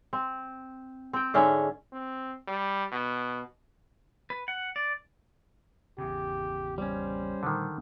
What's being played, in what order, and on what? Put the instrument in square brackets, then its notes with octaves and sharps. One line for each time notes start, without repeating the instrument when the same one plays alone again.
[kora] C4
C4 G5
G#2 D3 C#4 E5
[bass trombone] C4
G3
B2
[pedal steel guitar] B4
F#5
D5
[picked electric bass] G#1 E2 C#3 [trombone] G4
[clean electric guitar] G3 C#4 [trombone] C5
[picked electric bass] A#2 G3 A3 [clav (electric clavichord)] D3 D#3